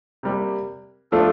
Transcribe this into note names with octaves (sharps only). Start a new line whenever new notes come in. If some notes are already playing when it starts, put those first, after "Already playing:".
C3 G3 A#3
F3 A3 D4 F4 A4